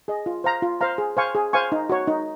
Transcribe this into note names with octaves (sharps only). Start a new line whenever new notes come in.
G#4 D#5
F4
C5 F5 A#5
F4
C5 F5 A#5
G#4
C5 F5 G#5 C#6
G#4
C5 F5 G#5 C#6
D#4
F#4 C#5
D#4